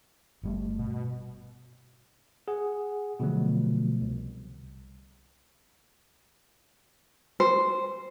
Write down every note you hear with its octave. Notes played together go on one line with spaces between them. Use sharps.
G1 G3 A3
B2
G#4 F#5
B2 D3 F3 F#3 A3
C2
C5